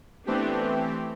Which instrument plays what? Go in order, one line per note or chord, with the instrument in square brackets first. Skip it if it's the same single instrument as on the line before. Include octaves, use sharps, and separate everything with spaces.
[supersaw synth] E3 A3 C4 G4 [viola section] B3 D4